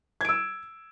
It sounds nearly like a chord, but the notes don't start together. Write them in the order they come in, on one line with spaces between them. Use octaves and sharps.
G#6 D7 E6